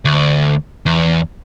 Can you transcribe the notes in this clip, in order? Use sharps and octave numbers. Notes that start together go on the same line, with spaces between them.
D2
E2